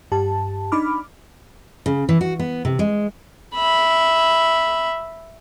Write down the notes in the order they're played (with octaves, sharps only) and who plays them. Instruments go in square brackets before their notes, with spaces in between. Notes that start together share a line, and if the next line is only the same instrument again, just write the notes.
[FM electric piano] G2 G4 A5
D4 D#4 B5 D6 F6
[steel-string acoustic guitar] C#3
E3
F#4
B3
C3
G#3
[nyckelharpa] E5 B5